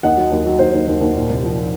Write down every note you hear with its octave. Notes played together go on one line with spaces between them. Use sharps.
D#2 D#5 F#5
F#3
D#2
F#3
D#2 C5
D#2
D#2
D#2
A#2
C2
F3
F3